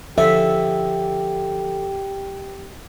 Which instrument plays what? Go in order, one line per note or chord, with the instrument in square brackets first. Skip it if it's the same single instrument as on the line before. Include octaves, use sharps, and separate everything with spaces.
[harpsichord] D3 F3 C#4 [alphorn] G4 [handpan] E5